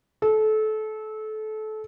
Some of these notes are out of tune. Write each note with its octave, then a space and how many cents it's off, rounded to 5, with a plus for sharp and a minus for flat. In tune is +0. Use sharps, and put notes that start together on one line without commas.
A4 -25